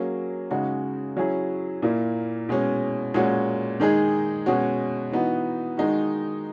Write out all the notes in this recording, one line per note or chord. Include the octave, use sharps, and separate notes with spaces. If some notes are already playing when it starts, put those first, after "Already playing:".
Already playing: F#3 A#3 C#4 G#4
C#3 G#3 D#4 F#4
F#3 C#4 E4 G#4
A#2 A#3 E4
B2 G#3 C#4
A#2 G#3 C#4 F#4
D#3 G#3 D#4 G#4
B2 G#3 C#4 F#4
E3 B3 D#4 F#4
D#3 G#3 D#4 F#4